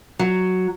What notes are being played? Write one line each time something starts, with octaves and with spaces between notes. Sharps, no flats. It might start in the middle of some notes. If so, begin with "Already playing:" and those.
F#3